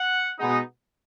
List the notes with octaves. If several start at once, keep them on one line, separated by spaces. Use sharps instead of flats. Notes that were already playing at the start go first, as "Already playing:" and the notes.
Already playing: F#5
B2 G#3 B3 D#4